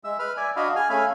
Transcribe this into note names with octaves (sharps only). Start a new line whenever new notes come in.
G#3 E5 E6
B4 B5 F6
D5 E5 G#5
D4 F#4 D#5 F5 B5
G#4 G#5 F6
A3 C#4 E5 F5 G#5 B5